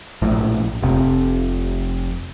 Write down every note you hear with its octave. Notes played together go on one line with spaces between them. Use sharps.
A#1 A2
F1 C3